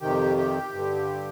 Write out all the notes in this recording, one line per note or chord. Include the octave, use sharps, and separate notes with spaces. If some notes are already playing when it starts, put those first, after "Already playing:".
F2 C3 D#3 G4
G4
G2 D3